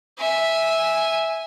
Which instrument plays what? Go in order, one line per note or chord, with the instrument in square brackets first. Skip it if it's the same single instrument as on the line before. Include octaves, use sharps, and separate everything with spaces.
[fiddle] E5 G#5